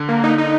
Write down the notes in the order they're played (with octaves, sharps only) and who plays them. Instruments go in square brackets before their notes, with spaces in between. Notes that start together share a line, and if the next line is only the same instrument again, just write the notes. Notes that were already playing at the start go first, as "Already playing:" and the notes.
Already playing: [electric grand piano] D3
[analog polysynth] A#3
D#4
D#4